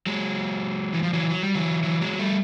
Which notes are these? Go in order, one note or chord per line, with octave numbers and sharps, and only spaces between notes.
F#3 G#3
E3
F3
E3 F#3
F#3
G3
E3 F#3
E3 F#3
F#3 G#3
G3 A3